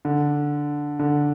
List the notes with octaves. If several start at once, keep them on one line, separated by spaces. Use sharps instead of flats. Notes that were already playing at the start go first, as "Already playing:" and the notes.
D3
D3